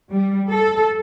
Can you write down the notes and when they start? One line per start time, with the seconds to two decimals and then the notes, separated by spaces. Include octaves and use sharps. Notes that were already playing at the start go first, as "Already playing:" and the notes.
0.11 G3
0.49 A4